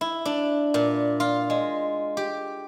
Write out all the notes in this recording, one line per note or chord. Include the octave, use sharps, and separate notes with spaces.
E4
D4
A#2
F4
G#3
G4